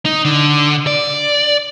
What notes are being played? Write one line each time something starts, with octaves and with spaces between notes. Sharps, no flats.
D#4
D3
D5